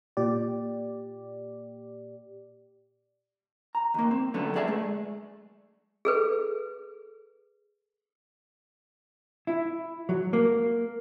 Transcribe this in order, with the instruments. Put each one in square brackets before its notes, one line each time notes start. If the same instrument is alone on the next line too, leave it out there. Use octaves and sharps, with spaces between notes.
[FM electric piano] A#2 G4 D5
[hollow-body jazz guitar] A#5
D#2 A#3
C4
D3 F#3 A3 B3 C#4
G#4 D5 E5 G#5
G#3 A3
[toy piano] G#4 A4 B4
[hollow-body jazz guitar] E4
F#3
A#3